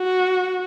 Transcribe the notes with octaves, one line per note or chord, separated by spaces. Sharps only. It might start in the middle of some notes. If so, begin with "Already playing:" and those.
Already playing: F#4